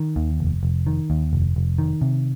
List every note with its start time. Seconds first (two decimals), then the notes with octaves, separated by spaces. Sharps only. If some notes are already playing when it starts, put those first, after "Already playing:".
Already playing: D#3
0.16 D#2
0.40 F1
0.63 F1
0.87 D#3
1.10 D#2
1.33 F1
1.56 F1
1.78 D#3
2.01 C3